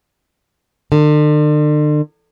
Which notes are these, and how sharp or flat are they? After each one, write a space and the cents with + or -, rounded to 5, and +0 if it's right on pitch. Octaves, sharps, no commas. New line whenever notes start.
D3 +40